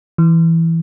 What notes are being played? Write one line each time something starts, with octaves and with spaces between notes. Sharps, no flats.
E3